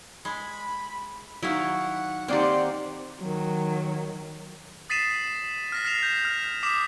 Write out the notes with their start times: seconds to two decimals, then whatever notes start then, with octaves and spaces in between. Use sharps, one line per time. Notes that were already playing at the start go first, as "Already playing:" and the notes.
0.25 G#3 B5
1.43 D#3 F#3 E4 F#4 F5 F#5
2.28 D#3 A#3 C4 G4 C5 D5
3.22 D#3 F#3
4.90 D#6 A6 B6 C7 D#7 E7
5.72 F6 A#6 B6
5.85 F6 A#6 C7 E7 F7
6.03 G6 A#6 E7
6.25 F6
6.63 D6 D#6 B6 E7